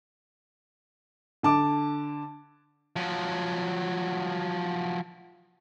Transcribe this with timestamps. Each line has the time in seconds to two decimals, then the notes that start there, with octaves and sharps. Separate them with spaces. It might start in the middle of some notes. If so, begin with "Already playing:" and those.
1.43 D3 A5 D6
2.96 F3 F#3